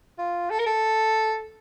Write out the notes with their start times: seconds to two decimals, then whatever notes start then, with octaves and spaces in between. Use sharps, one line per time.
0.19 F4
0.50 A4
0.59 A#4
0.66 A4